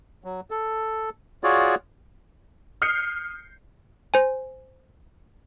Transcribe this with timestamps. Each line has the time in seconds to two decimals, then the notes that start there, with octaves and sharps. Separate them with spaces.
0.24 F#3
0.51 A4
1.44 F4 F#4 G#4 C#5 D5
2.82 D#6 F6 G6 C7 C#7
4.14 C5 G#5